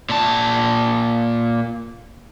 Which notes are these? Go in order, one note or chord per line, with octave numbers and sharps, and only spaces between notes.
A#2 A5